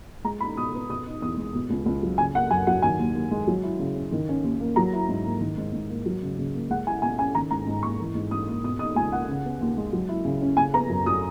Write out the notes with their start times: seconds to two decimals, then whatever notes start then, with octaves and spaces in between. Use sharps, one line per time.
0.24 G#3 A#5
0.40 D#4 B5
0.57 B2 D#6
0.74 B3
0.89 B2 D#6
1.06 D#4
1.22 E2 D#6
1.37 G#3
1.55 B2
1.70 C#2
1.86 C#2
2.03 F#3
2.18 C#3 G#5
2.34 A#3 F#5
2.51 F#2 G#5
2.67 F#3 F#5
2.82 D#3 G#5
2.99 D#2
3.15 D#2
3.31 G#3
3.47 F#3
3.63 E4
3.79 C#3
3.95 C#4
4.12 D#3
4.29 C#4
4.44 D#2
4.60 A#3
4.76 F#3 A#5
4.93 E4
5.08 G#2
5.25 A#3
5.41 D#3
5.57 G#2
5.73 G#2
5.89 A#3
6.06 F#3
6.22 C#3
6.38 C#3
6.54 A#3
6.70 G#3 F#5
6.87 E4 G#5
7.02 B2 G#5
7.18 C#4 G#5
7.35 D#3 A#5
7.51 G#2 A#5
7.66 G#2
7.83 A#3 C#6
8.00 E3
8.15 G#2
8.31 G#2 D#6
8.47 A#3
8.64 B2 D#6
8.79 D#4 D#6
8.95 C#2 G#5
9.12 A#3 F#5
9.29 C#3
9.45 B3
9.61 D#2
9.77 G#3
9.93 F#3
10.09 E4
10.25 C#3
10.42 C#4
10.57 C#3 G#5
10.73 B3 A#5
10.90 F#2
11.06 F#3 D#6